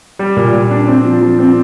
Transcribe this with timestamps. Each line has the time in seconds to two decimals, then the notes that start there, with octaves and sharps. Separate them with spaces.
0.19 G3
0.37 A#2
0.53 A#2
0.71 D4
0.88 C4
1.05 F3
1.21 F3
1.39 C4